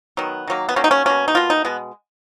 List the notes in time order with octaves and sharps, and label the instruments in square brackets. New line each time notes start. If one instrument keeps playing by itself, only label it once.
[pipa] D#3 F#3 B3
D#3 F#3 A#3
B3
D#3 F#3 A#3 C#4
D#4
C#4
B2 A#3 C#4
D#4
B2 A#3 F4
D#4
B2 G#3 B3